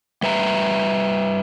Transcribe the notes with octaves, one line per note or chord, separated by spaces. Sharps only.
G3 B4 E5 A#5